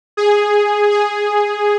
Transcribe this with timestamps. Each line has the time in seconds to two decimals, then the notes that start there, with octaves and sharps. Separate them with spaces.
0.17 G#4
0.91 G#4